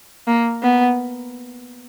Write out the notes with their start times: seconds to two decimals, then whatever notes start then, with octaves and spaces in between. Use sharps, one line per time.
0.27 A#3
0.62 B3